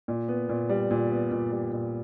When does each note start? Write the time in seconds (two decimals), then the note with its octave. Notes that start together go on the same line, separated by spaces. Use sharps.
0.08 A#2
0.28 B3
0.49 A#2
0.69 G3
0.91 A#2
1.11 B3
1.32 A#2
1.51 G3
1.72 A#2